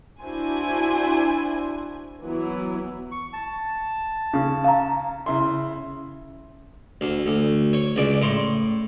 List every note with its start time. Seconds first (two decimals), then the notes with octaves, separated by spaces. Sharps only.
0.21 D4 E4 F#4 C5 G#5
2.23 E3 F#3 B3 E4
3.12 C#6
3.33 A5
4.34 C#3
4.64 F5 A#5
5.26 C#3 E4 C6
7.01 D2
7.26 D2
7.73 C#5
7.96 C#2 D5
8.22 A2 C6